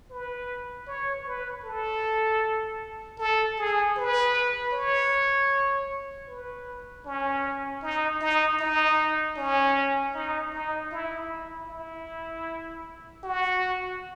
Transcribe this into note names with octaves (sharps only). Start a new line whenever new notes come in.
B4
C#5
B4
A4
A4
G#4
B4
C#5
B4
C#4
D#4
D#4
D#4
C#4
D#4
D#4
E4
E4
F#4